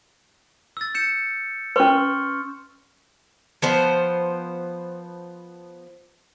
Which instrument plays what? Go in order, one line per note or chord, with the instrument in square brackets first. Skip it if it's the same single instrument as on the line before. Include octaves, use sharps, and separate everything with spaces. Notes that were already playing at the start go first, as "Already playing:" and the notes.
[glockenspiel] E6 A6
G6 C#7 E7
[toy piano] C#4 B4 [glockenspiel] C6 C#6 F6
[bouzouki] F3 B3 C5